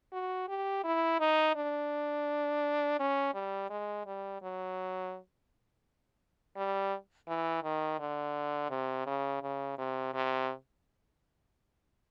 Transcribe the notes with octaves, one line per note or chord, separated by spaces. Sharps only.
F#4
G4
E4
D#4
D4
C#4
G3
G#3
G3
F#3
G3
E3
D#3
D3
C3
C#3
C#3
C3
C3